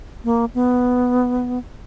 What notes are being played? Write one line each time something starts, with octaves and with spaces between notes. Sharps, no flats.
A#3
B3